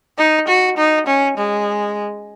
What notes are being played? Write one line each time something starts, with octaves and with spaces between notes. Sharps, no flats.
D#4
F#4
D#4
C#4
G#3